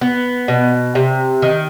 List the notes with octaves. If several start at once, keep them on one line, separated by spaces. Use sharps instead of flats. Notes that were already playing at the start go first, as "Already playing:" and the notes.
B3
B2
C3
D#3